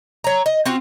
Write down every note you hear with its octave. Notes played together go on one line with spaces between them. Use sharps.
C#5 A#5
D#5
C4 F4 F#4